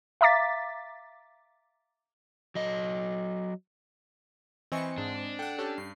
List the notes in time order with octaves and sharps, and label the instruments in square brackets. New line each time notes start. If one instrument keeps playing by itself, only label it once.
[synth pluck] E5 F5 A#5 D6 A6 B6
[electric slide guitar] F#3 D#5
[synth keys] E3 C#6 C#7 [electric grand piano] C4 D#5 G#5
[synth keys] G#2 [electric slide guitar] D4
[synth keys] A4 F#5 [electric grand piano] G5
[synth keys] C#4 G4 [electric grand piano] A4
[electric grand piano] G2 [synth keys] C7